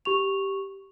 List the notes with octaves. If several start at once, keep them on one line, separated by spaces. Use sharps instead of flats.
G4 C#6 F7